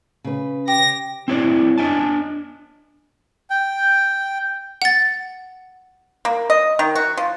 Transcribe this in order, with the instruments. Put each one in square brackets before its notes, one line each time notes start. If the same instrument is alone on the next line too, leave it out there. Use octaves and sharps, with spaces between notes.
[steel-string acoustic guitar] C#3 B4
[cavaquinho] G4 [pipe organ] A#6
[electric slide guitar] C4 E4 C#5 D5
D4 D#5 G#5 A5
[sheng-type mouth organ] G5
[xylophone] F#5 A6
[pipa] A#3
D#5
D#3
F#4
F3